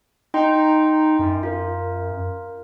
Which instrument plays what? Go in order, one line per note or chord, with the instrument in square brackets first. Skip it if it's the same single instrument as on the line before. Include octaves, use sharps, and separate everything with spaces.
[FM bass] D#4 [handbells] D#5 G5 C6
[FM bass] F#2
[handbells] F4 A#4